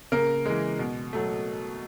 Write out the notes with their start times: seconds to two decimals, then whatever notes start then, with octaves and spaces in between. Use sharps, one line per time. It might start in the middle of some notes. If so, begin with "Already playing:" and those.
0.12 C#3 A#3 A#4
0.45 E3 G#3
0.79 B2
1.13 F#3 A3